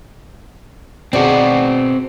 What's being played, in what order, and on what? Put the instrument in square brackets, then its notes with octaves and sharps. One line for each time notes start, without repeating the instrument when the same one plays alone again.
[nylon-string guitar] B2 G#4 D5 [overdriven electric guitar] C4 F#4